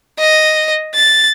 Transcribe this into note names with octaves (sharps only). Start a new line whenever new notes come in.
D#5
A6